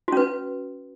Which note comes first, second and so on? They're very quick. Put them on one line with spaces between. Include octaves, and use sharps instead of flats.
F#4 C#4 B4